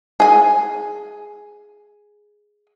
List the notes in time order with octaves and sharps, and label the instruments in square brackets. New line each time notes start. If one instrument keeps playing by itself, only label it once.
[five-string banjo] G#4 G#5